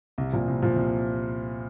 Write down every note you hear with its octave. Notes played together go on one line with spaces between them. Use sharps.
C2
A#2 F3
C2
A#2 F3
C2